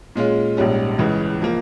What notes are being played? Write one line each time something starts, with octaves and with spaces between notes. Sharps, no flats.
A#2 G#3 C#4 F4
A#1 G#2 G3 C#4
C#2 C#3 E3
F3 A#3